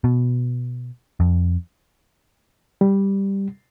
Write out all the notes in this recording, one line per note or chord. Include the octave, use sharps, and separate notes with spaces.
B2
F2
G3